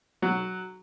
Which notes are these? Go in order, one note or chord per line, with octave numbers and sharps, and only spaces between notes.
F#3